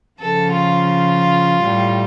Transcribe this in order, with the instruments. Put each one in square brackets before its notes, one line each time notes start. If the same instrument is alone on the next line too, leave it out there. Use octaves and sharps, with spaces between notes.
[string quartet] C#3 F3 A4
F4
A2 G3